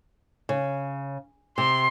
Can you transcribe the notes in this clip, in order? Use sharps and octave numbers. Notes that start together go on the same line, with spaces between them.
C#3
C3 C6